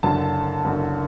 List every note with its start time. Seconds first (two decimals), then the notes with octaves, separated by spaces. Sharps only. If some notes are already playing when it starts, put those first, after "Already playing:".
0.03 F#1 F#2 D3 A5
0.65 F#1 F#2 D3